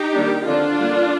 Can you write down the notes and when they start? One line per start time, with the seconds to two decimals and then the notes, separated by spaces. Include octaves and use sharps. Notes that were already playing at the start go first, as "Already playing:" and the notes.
Already playing: D#4 G4
0.14 D#3 G3 A#3 D4
0.45 D3 F3 C4 D4 F4
0.78 D3 G3 A#3